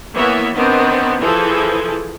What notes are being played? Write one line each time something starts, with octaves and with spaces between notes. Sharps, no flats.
E3 A#3 B3 C#5 E5
D#3 B3 C4 D4
E3 F3 E4 G#4 A4